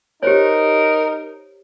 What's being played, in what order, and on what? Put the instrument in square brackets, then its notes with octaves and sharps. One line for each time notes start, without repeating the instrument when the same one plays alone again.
[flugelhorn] D#4 [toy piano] G4 C5 C#5 [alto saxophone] A#4